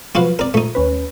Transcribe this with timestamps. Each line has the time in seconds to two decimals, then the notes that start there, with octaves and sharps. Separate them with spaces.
0.15 F3 F#3 F4 F#4 B4 F5
0.39 C4 A#4 D5
0.54 A#2 F3 A3 D#4
0.75 D#2 C#4 B4